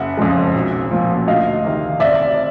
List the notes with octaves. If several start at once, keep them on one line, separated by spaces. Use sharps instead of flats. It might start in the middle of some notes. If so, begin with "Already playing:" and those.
Already playing: F#1 E5 F#5
F2 C#3 F3 G#3
B1
A#2 F3
D2 D#5 F5
C3 D#3
F1 D5 E5